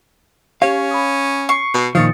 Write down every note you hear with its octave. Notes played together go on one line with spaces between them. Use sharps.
C#4 G4 C#5 F5
B5 D#6
C#6 C7
B2
A#2 D#3 F3 F4 D#6 A6 C#7